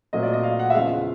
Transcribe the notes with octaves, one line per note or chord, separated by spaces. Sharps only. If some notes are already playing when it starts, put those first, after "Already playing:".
A#2 F#3 A3 C4 D#5
D5
D#5
F5
F#5
E5
E2 C#3 F3 G#3 F5